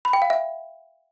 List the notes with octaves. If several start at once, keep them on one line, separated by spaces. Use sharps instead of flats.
B5
G5
F5
E5